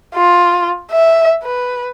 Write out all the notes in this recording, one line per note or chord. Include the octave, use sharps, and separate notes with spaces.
F4
E5
B4